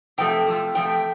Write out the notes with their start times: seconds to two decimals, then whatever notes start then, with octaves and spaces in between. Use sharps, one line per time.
0.18 C3 F3 A3 G5
0.46 C3 F3 A3
0.75 C3 F3 A3 G5